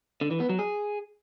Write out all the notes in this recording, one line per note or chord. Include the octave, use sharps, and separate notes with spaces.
D3
E3
B3
F#3
G#4